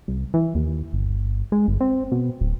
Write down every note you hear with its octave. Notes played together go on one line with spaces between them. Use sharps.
C2
E3
D#2
G1
G#3
G1
C4
B2
D1